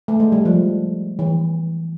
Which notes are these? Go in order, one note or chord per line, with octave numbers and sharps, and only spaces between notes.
A3
G#3
G3
F3
E3